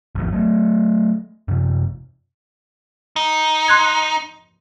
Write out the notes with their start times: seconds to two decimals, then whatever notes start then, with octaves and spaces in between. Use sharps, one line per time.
0.15 G#1 E2 F3
0.32 F#3 A3
1.48 F#2 C3
3.16 D#4
3.68 C6 F#6 G#6